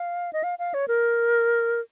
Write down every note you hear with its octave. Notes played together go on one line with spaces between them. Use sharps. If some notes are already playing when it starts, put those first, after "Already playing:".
Already playing: F5
D#5
F5
F5
C#5
A#4